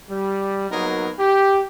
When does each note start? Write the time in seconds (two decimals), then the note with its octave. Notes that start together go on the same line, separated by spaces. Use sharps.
0.10 G3
0.71 F#3 A#3 B3 D#4 G#4 A#4
1.19 G4